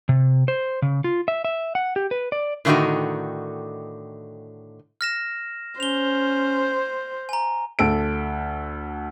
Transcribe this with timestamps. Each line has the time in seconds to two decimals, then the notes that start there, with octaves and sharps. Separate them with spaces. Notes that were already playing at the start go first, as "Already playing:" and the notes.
0.09 C3
0.48 C5
0.82 C#3
1.04 F4
1.28 E5
1.45 E5
1.75 F#5
1.96 G4
2.11 B4
2.32 D5
2.65 A2 D3 D#3 A3 D#4 F#4
5.01 F6 A#6 E7
5.80 C#4 C5 F7 G7
7.29 G#5 A#5
7.79 D2 A4 D7